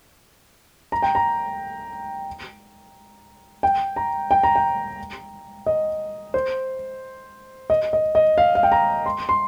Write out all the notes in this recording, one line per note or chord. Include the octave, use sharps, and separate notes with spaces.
A#5
G5
A#5
G5
A#5
G5
A#5
G5
D#5
C5
D#5
D#5
D#5
F5
F5
G5
A#5
C6
C6